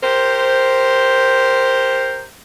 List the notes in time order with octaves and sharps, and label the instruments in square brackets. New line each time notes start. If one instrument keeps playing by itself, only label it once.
[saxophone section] G4 A#4 C5